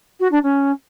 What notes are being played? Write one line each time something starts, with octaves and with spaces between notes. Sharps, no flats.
F#4
D4
C#4